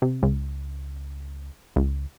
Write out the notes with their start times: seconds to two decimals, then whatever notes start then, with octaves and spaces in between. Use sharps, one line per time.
0.02 C3
0.23 C#2
1.76 C#2